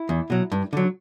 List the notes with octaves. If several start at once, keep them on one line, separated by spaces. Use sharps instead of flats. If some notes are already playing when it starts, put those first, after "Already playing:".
Already playing: E4
E2
B2 F#3
G2
D3 F#3